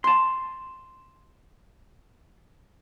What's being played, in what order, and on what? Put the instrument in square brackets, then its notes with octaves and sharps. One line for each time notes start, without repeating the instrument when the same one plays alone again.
[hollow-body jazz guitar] A5 C6